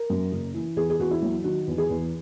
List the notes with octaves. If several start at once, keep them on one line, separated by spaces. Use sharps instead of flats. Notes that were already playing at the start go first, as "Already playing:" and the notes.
Already playing: A#4
F#2
F#1
E3
E2 G#4
G#4
E2 F#4
E4
F#3
D#3 F#4
E2
G#4
E2